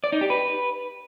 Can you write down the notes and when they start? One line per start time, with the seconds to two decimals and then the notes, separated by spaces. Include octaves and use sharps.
0.04 D5
0.12 D#4
0.21 G4
0.30 B4